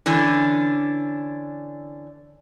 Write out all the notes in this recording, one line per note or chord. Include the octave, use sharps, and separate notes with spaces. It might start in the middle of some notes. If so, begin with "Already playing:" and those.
D3 E3 C#4 D4